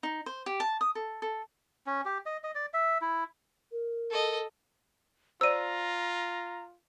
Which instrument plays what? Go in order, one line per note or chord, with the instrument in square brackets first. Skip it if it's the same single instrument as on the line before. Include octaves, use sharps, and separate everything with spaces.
[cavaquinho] D#4
C5
G4
A5
D#6
A4
A4
[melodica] C#4
G4
D#5
D#5
D5
E5
E4
[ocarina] A#4
[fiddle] A4 D#5
[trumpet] F4 [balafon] C5 D5 [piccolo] A#5 [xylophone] E6 D#7